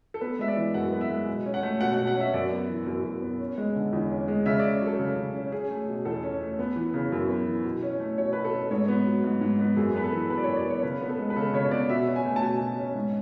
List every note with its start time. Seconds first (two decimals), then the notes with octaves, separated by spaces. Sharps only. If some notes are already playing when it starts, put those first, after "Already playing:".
0.14 A4
0.21 B3 B4
0.39 G#3 E5
0.48 D5
0.56 E3
0.74 F#2 F#5
0.92 B3
1.01 E5
1.10 G#3
1.27 B2
1.46 C#4
1.54 F#5
1.63 A3
1.81 B2 F#5
1.94 B2 F#5
2.07 F#5
2.16 C#4 E5
2.34 F#2 D5
2.51 B3
2.69 E3
2.87 F#2
3.04 F#2
3.22 B3
3.40 C#4
3.58 G#3
3.76 D3
3.93 E2
4.10 C#4
4.28 G#3
4.46 C#3 E5
4.59 C#4 D5
4.81 F#3
4.86 A4
4.99 C#3
5.17 C#3
5.35 C#4
5.52 C#4 G#4
5.70 A3
5.88 B2
6.05 E2 A4
6.23 C#4
6.40 A3
6.59 B3
6.76 E3
6.94 C#3
7.12 F#2
7.29 B3
7.46 E3
7.65 B2
7.82 C#4
7.99 A3
8.18 B2 C#5
8.33 B2 B4
8.45 A4
8.53 C#4
8.71 G#2 C#5
8.88 B3
9.06 F#3
9.24 G#2
9.41 G#2
9.59 B3
9.77 F#2 G#4
9.94 B3 B4
10.04 A4
10.13 E3
10.30 F#2 B4
10.37 D5
10.44 F#2 C#5
10.56 D5
10.66 B3 C#5
10.83 C#3 B4
11.01 B3
11.09 A4
11.19 G#3
11.30 B4
11.36 C#3 A4
11.54 C#3 C#5
11.71 B3 D5
11.89 B2 E5
12.07 C#4
12.16 G#5
12.25 A3
12.36 A5
12.42 B2 G#5
12.60 B2
12.78 C#4
12.95 G#2